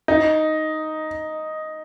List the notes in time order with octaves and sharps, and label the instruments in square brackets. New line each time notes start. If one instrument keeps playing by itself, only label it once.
[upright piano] D#4